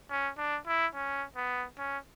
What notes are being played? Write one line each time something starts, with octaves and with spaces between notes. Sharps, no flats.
C#4
D4
E4
C#4
B3
C#4